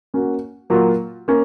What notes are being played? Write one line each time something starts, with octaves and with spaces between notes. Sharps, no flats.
A#3 C#4 F#4
A#2 F#3 A#3 F4
A#3 C#4